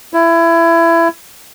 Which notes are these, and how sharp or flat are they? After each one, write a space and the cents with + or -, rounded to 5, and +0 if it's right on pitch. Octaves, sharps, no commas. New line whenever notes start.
E4 +20